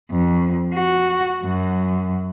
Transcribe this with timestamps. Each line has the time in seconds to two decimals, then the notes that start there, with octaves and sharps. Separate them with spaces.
0.11 F2
0.75 F#4
1.44 F#2